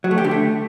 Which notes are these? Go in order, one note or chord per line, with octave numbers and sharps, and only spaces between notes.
F#3
A3
G4
D3
A3